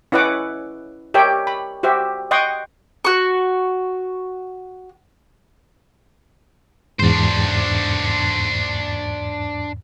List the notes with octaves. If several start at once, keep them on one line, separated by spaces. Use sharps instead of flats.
C#4 E4 B4 D#5 F#5 D6
G4 A#4 C#5 D#5 E5 G5
B5
F#4 G4 C5 E5
D#5 F#5 G5 C6 C#6 D#6
F#4 C#6
E2 G#2 D4 C5